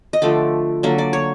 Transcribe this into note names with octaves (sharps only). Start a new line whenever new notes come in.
D#5
D3 F3 A3 D5
D3 F#3 A#3
D5
C#5